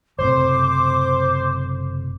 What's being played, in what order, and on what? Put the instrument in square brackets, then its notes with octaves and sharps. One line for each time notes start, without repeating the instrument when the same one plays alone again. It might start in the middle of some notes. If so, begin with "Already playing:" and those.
[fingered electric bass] F#1 A2 C3 [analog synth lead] C5 [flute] D6